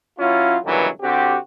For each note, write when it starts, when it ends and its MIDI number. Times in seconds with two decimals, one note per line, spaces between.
0.18 0.57 54
0.18 0.57 61
0.18 0.57 64
0.18 0.57 65
0.64 0.88 37
0.64 0.88 43
0.64 0.88 47
0.64 0.88 51
0.64 0.88 52
0.64 0.88 54
1.02 1.35 50
1.02 1.35 60
1.02 1.35 66
1.02 1.35 67